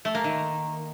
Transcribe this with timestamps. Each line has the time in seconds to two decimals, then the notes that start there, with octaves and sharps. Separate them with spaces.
0.05 A3
0.15 A#3
0.24 D#3